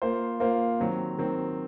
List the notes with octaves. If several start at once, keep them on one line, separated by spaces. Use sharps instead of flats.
A#3 F4 C5
A#3 F4 C5
D#3 F#3 C4
D#3 F#3 C4